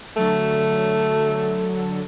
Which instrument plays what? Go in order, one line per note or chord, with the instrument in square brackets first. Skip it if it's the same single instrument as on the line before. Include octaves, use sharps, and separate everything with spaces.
[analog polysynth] D3 F#3 A4 [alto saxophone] A3